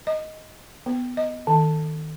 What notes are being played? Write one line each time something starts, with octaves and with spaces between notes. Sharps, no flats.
D#5
B3
D#5
D#3